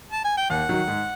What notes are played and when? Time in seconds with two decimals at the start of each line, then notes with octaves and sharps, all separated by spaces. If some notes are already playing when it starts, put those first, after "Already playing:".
0.11 A5
0.24 G#5
0.37 G5
0.50 D#2 F#5
0.69 D#3 F#3
0.87 G#2